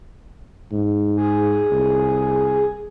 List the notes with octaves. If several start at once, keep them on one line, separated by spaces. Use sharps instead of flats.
G#2
G#4
C2